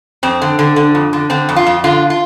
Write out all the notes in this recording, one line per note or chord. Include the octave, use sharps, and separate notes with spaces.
F2 C4
D3
D3
D3
F2
D3
D3 C4
F2
F4
F2
D3 F4
F4